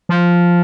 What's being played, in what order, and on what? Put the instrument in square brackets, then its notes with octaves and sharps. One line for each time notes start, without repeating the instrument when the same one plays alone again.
[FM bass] F3